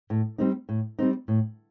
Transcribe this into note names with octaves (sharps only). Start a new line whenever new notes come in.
A2
G3 C4 D#4
A2
G3 C4 D#4
A2